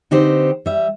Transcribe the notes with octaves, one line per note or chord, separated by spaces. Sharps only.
D3 C4 D#4 G4 B4 C5
G3 E5